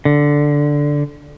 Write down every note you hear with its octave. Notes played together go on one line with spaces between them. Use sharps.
D3